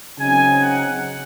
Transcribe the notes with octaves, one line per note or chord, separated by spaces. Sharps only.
C#3 F#3 C4 D#4 G#5
F#5